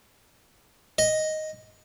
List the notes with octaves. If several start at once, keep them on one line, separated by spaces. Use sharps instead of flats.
D#5